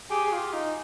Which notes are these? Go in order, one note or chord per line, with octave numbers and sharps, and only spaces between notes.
G4 G#4
F4
D#4